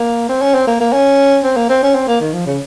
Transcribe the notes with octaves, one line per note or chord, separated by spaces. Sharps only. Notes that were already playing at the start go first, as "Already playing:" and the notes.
Already playing: A#3
C4
C#4
C4
A#3
A#3
C#4
C4
A#3
C4
C#4
C4
A#3
D#3
F3
C#3